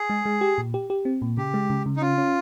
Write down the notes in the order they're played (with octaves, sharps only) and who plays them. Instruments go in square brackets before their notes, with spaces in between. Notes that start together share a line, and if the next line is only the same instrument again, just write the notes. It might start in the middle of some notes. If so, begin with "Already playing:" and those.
Already playing: [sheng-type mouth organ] G#4
[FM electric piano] G#3
G#3
G4
A#2
G4
G4
C4
A#2
[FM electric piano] C#3 [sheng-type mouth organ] G4
[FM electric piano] G#3
C#3
C#3
[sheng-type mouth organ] D#4
[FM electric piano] C#4 [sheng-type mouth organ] F4
[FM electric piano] C#4